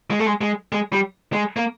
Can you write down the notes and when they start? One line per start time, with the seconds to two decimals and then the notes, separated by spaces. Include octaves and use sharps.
0.11 G#3
0.19 A3
0.26 G#3
0.41 G#3
0.72 G#3
0.93 G3
1.33 G#3
1.56 A#3